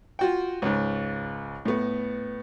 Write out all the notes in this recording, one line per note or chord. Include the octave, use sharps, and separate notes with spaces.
F4 F#4 G5
C#2 G#2
A2 B3